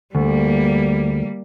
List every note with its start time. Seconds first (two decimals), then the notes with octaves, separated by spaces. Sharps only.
0.15 D2 G3 A#3